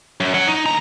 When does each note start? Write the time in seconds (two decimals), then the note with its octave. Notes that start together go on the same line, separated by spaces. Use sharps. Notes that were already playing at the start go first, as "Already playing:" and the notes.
0.20 F#2
0.34 C#5 F#5
0.47 D#4
0.66 D2 A#5